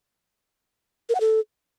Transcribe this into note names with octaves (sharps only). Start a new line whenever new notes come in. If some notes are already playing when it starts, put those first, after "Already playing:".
A#4
F#5
A4